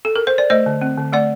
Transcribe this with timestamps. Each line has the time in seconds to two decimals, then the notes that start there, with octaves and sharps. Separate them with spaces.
0.05 A4
0.16 A#4
0.27 C5
0.38 D5
0.50 A3 C5 D#5
0.66 D3
0.81 C4
0.98 D3
1.13 A3 D5 F#5